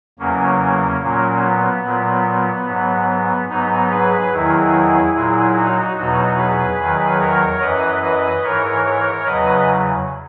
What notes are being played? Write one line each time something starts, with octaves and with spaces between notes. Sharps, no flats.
E2 C#3 F#3 A#3 C#4
A#2 F#3 A#3 C#4
B3
A#2 F#3
G#2 F#3
B3
G#2 F#3 B3 D#4
G#4 B4
E2 D#3 F#3 E4 G#4
A#2 F#3 E4 G#4
D#4 F#4
E2 B2 F#3 D#4 F#4
G#4 B4
E2 D#3 F#3
A#4 C#5
F#2 E3 B4 D#5
B4 D#5
G#2 E3 A#4 C#5
A#4 C#5
E2 C#3 F#3 B4 D#5